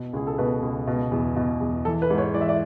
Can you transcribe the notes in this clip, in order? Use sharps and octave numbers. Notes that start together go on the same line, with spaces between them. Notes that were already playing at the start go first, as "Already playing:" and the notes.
Already playing: B2
C#2 G#4
A4
B2 B4
C#2
B2
E2
B2
E2
E3 A4
B4
G#2
C#5
E3 D5
E5
D5